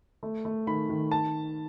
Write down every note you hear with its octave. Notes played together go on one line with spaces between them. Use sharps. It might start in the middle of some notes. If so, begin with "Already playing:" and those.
A3
A3
D#3 B5
D#3
A5